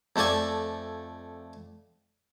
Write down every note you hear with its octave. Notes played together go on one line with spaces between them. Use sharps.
F2 A3 A4 D5 G#5